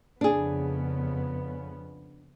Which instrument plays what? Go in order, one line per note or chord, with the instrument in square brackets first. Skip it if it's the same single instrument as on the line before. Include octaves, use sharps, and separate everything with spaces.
[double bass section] F2 C#3 B3 [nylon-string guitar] D4 G#4